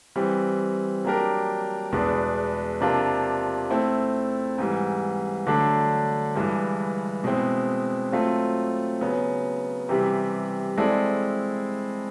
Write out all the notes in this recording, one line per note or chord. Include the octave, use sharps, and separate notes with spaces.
E3 G3 C4
F#3 A#3 D4 G4 A#4
E2 B2 G#3 B3 D4
C3 F3 A#3 D4 F4
A3 C4 E4
G#2 E3 G3
D3 F#3 A3 D4
G2 E3 G#3
B2 G#3 C4 E4
F#3 A3 C4 F4
C#3 F#3 B3
C3 E3 G3
G#3 C4 E4 A4 D5